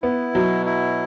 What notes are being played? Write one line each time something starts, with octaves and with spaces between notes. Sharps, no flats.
B3 E4
B2 F#3
E4